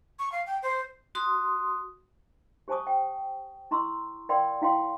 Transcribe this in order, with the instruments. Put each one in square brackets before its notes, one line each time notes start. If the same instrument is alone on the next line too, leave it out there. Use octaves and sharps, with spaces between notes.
[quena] C#6
F5
G5
C5
[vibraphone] F#4 C6 D#6
[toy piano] G4 C5 G#5 A5 C#6 D#6
G5
E4 A#5 C6 C#6 E6
A#4 D5 F5 G5 B5 C6
E4 F5 G5 C6